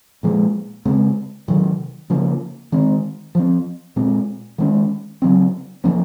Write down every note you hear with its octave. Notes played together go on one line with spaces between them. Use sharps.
A#2 F3 G#3
C#3 G#3 C4
C3 D#3 F#3
C#3 F3 A#3
D#3 G#3 C4
F3 C4
A#2 G#3 C4
D#3 G#3 C#4
C#3 F#3 C4
C3 F3 A#3 C#4